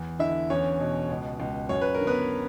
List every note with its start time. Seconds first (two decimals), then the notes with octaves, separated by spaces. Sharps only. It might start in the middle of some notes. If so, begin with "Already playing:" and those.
Already playing: E2
0.19 D3 E4 E5
0.50 E2 C#4 C#5
0.80 B2
1.09 C#2
1.40 C#2
1.69 F#2 C#5
1.81 B4
1.94 A#4
2.00 D3
2.07 B3 B4